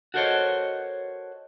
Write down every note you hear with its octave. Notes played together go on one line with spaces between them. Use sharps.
F#4 A4 A#4 C5 C#5 D#5